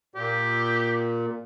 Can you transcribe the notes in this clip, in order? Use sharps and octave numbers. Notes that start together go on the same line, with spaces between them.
A#2 G4